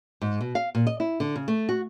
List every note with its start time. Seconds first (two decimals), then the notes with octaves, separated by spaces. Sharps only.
0.22 G#2
0.41 B2
0.55 F5
0.75 A#2
0.87 D#5
1.00 E4
1.20 D3
1.36 C#3
1.48 A3
1.69 F#4